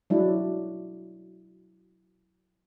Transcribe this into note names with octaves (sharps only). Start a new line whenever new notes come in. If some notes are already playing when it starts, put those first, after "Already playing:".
F#3 G#3 D4 E4